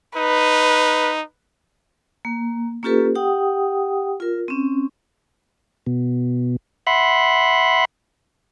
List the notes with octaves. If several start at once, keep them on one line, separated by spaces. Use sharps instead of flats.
D#4 B4
A#3
A#3 C#4 F4 G4 A4 B4
G4 F#5 G5 D#6
F4 A#4
C4 C#4
B2
E5 F#5 B5 C6 F#6